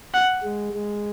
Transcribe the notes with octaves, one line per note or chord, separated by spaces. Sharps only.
F#5
G#3
G#3